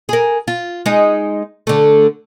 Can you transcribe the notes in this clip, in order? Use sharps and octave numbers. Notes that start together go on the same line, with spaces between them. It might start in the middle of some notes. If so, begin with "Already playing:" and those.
G#4 A#4
F4
G#3 D#4
D3 A3